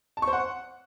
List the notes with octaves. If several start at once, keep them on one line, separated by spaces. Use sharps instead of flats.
A5
C#6
C5
F#5